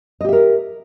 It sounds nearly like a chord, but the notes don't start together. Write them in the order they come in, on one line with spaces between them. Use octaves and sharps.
D#5 G4 E5 A#4